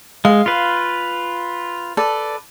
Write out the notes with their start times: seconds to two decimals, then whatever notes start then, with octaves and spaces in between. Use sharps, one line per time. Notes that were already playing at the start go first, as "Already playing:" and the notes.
0.25 G#3 F5
0.46 F4 B4
1.97 A4 B4 D5